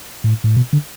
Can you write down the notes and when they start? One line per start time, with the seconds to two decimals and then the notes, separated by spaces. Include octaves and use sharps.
0.24 A2
0.44 A2
0.57 B2
0.73 D3